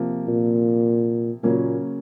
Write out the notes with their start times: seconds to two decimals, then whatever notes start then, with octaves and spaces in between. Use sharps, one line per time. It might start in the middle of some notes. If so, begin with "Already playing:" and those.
Already playing: C3 F3 A#3
0.28 A#2
1.43 A#2 C#3 F#3 A#3 C#4